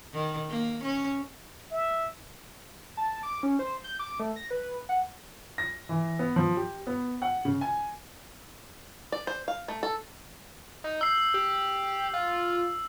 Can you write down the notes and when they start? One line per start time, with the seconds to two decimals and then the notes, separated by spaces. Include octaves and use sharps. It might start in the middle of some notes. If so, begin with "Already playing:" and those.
0.13 D#3
0.49 A#3
0.83 C#4
1.71 E5
2.97 A5
3.23 D6
3.43 C#4
3.59 C5
3.84 G6
3.99 D6
4.20 A3
4.36 A#6
4.51 B4
4.89 F#5
5.58 A#6
5.89 E3
6.19 B3
6.36 F3
6.57 G4
6.87 B3
7.22 F#5
7.45 C#3
7.61 G#5
9.12 D5
9.27 C5
9.48 F5
9.68 A3
9.83 A4
10.84 D#4
11.01 E6 G6 C7
11.34 G4
12.14 F4